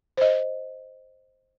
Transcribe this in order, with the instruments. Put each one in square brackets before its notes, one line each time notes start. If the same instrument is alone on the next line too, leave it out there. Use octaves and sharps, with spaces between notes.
[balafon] C5 D#5